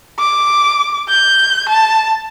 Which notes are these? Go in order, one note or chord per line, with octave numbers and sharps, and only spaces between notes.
D6
G6
A5